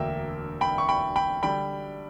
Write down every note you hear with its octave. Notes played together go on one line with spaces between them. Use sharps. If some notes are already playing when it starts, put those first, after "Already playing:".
Already playing: E1 D2 D3 A#3 E5 G5
G5 B5
C#6
G5 B5
G5 B5
D3 G3 G5 B5